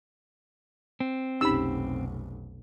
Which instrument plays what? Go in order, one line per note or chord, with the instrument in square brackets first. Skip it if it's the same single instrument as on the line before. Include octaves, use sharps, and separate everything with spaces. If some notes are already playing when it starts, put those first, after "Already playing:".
[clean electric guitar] C4
[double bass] F1 B1 [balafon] C#4 D#4 G4 [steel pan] B5 E6